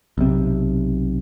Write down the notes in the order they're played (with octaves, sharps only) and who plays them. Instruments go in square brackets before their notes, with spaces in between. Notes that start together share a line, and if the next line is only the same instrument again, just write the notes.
[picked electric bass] B1 C3